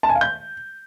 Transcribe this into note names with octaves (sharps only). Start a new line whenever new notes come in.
A5
G#5
F5
G6